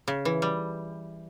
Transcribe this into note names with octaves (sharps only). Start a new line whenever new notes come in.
C#3
E3
G3